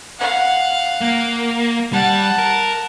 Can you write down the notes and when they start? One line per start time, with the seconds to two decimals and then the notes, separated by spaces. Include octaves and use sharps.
0.19 F5 F#5
1.01 A#3
1.93 G3 F#5 A5
2.38 A#4